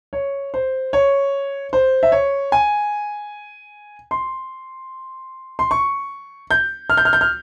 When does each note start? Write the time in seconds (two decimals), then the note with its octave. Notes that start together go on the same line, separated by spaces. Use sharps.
0.13 C#5
0.54 C5
0.93 C#5
1.73 C5
2.03 E5
2.12 C#5
2.52 G#5
4.11 C6
5.59 C6
5.71 C#6
6.51 G6
6.90 F6
6.97 G6
7.05 F6
7.13 G6
7.21 F6